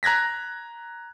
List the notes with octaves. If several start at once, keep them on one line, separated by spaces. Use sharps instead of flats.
A#5 F#6 G#6 A#6 B6